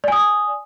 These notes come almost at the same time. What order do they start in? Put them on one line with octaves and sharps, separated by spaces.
D5 G#5 D#6